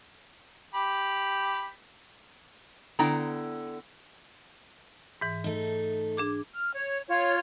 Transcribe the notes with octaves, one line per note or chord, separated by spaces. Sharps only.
G4 B5
D3 B3 E4 G5 A#5
G#2 E3
A3 D#4
D4 G#4 D6
F6
C#5
F4 C#5